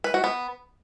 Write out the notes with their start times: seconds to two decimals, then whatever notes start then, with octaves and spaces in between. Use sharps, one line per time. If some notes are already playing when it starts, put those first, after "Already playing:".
0.04 B4
0.14 F#4
0.24 B3